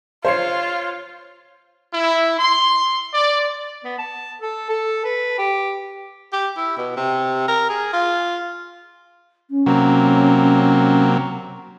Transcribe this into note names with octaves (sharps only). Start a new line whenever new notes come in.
F4 C5 C#5 C7
E4
C6
D5
B3
A5
A4
A4
B4
G4
G4
E4
B2
C3
A#4
G#4
F4
C#4
C3 F#3 A#3